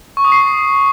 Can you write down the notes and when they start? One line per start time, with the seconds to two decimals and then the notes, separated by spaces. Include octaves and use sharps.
0.17 C#6
0.25 D#6
0.32 C7